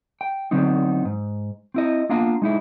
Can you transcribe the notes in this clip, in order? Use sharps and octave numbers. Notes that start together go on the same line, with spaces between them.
G5
D3 F#3 B3 C4 D#4
G#2
C4 E4 D#5
A#3 B3 D4 F4 F5 A#5
G#3 D#4 E4